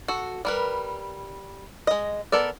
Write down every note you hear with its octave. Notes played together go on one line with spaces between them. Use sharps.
F#4 A4
G3 A#4 B4
G#3 D#5
B3 A4 A#4 D5